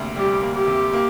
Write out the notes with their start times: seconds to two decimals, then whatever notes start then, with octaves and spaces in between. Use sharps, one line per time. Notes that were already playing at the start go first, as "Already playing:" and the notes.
Already playing: D2 C3 A#3
0.16 G3 G4
0.42 A#3
0.55 G4
0.67 C3
0.93 A#3